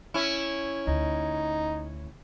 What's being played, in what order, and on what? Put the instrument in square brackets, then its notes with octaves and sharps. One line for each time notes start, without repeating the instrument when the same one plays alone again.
[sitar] C#4 E4
[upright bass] D2 [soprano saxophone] D#4